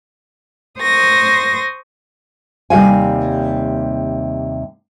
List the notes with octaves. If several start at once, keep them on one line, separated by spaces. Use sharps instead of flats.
C5 C#6 D#6 A#6
D#2 C3 G3 F5 G#5